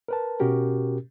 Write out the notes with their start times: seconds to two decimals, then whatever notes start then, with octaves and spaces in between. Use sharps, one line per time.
0.08 A#4 B4 A5
0.40 B2 C#4 F#4 G4 A#4